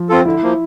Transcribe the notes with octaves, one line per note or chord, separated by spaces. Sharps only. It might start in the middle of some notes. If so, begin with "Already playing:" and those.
Already playing: F3
C4 F4 A4
D3 E4
F3 A#3